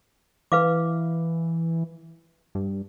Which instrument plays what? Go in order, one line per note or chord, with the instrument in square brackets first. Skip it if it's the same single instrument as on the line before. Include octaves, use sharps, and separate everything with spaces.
[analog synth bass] E3 [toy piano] B4 F5 D6
[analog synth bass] G2